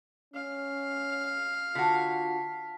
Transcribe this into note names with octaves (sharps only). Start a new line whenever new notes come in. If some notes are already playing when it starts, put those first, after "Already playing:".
C#4 F5
D3 F4 F#4 A5 B6